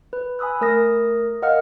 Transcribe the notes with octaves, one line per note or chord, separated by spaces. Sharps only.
B4
G#5 B5 D#6 E6 F#6
A3 A#4 D#6 A#6
A#4 D#5 F5 F#5 F6